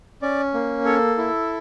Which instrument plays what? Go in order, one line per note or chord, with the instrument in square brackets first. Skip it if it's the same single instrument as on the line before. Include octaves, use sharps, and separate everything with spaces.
[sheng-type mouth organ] C#4 D5
A#3
A4 C#5
E4